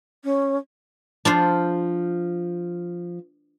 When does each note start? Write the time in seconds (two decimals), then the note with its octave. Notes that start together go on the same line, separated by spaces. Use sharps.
0.24 C#4
1.25 F3 D4 F4 C5